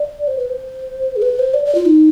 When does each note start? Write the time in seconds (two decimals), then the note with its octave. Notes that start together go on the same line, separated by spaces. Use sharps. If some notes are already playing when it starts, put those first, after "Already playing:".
Already playing: D5
0.28 C5
0.38 B4
0.50 C5
1.16 G#4
1.22 B4
1.39 C5
1.54 D5
1.65 D5
1.75 F4
1.86 D#4